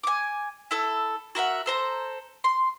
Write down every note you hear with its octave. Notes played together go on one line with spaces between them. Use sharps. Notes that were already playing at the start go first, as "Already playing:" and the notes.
G#5 D6
E4 A4 E6
F#4 A#4 E5 F#5
A4 C5 A#5
C6